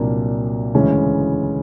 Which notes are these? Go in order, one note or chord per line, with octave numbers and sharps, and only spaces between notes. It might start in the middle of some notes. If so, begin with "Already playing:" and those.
Already playing: C2 A#2 F#3 A#3 D4
D2 C#3 E3 G#3 C#4